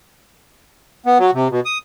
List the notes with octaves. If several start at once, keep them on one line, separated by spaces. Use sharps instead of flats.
B3
F#3
C3
B2
D#6